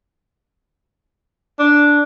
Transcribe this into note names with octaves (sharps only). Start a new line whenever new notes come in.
D4